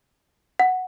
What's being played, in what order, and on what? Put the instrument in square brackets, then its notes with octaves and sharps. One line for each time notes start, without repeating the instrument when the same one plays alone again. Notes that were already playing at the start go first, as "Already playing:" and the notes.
[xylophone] F#5